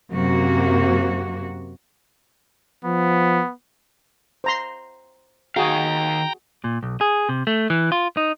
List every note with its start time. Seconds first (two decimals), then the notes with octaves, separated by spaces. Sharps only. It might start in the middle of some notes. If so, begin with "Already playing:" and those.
0.11 F#2 C3 A#3 F#4
2.85 F3 B3
4.44 C5 A#5 C6
5.56 D#3 F#4 G#4 F5 G5 A#5
6.64 A#2
6.83 B1
7.01 G#4
7.29 C3
7.47 A3
7.70 E3
7.92 F4
8.17 D#4